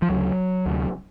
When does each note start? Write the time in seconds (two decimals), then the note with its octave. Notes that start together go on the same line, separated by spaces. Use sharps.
0.02 F3
0.09 D2 C#3 F#3
0.66 D2 C3